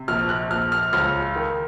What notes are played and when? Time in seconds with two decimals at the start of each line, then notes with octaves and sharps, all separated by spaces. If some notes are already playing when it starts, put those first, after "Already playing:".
Already playing: C3
0.08 A#1 F6
0.29 F#6
0.50 A#1 F6
0.72 F6
0.93 C#2 F6
1.36 D#3